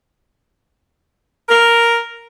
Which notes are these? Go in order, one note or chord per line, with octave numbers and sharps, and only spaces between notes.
A#4